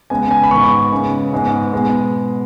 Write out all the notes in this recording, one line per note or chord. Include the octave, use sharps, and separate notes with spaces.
C#3 G#3 B3 G#5
G#5
B5
G#2 D#3 B3 C#6
C#3 G#3 B3
G#2 G#3 B3
B2 G#3 B3